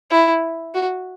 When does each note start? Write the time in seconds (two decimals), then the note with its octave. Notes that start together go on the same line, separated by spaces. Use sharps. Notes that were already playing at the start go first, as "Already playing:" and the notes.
0.11 E4
0.74 F#4